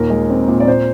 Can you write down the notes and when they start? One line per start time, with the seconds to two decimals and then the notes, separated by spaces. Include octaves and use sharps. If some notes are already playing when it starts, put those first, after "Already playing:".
Already playing: D#2 A#2 A#4
0.10 G#3
0.30 C4
0.48 A#2
0.60 D5
0.68 A#2 C5